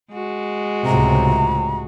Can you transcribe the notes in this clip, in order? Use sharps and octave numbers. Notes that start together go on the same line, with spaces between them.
G#3 F#4
C#2 A2 C3 A#5